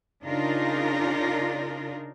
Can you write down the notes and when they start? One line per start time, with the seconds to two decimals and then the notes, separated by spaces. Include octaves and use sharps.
0.24 C#3 D4 D#4 F4 A#4